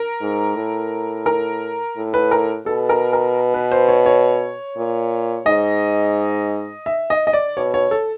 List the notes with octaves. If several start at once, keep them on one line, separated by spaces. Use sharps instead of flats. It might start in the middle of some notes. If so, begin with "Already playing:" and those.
Already playing: A#4
G#2
A2
A#4
A2
B4
A#4
B2 A4
A#4
A#4
B4
C5
C#5
C#5
A#2
G#2 D#5
E5
D#5
D#5
D5
B2 C#5
C#5
A4